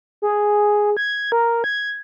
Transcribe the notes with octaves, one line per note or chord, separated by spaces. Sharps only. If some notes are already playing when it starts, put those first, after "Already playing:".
G#4
G#6
A#4
G#6